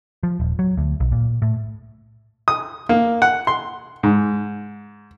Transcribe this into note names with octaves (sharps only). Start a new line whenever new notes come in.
F3
D#1
F#3
D2
B1
A#2
A2
D#6
A#3
F#5
C6
G#2